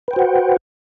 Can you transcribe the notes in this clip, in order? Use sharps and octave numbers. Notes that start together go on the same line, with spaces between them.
F#4 B4 C5 F#5 G5